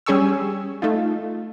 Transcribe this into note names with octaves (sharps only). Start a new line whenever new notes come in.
G3 C#4 G#4 G#5 C#6 E6
A3 D#4 F4